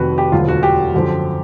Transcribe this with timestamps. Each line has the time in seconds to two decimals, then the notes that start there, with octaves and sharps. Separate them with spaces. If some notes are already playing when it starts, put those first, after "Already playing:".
Already playing: F1 F2 C3 D#3 F#4 B4
0.18 G4
0.32 E1 D2 D3 F#3 F4
0.48 F#4
0.63 G4
0.94 F#2 D3 F3